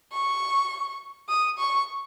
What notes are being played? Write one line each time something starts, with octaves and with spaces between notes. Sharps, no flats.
C#6
D#6
C#6